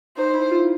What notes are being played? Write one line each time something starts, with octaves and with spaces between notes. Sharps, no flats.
D#4 C5
E4
F4